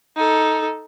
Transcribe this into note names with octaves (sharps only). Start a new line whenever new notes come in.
D#4 A4